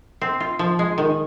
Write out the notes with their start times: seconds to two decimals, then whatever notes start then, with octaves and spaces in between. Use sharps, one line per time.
0.21 C4
0.40 F4
0.59 F3
0.79 G#3
0.98 D#3